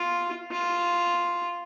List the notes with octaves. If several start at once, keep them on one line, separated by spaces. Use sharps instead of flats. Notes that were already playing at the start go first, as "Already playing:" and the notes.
Already playing: F4
F4